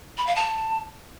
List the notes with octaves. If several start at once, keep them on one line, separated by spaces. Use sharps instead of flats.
B5
F5
A5